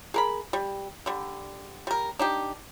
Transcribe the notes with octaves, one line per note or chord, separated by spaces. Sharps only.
G#4 A#4 B5
G3
D3 G3
G3 A#4
D4 D#4 G4